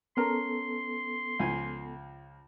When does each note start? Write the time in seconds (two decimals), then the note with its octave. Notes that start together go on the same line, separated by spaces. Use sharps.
0.17 B3 C#4 A4 A#4 A#5 C6
1.39 C#2 F3 G#5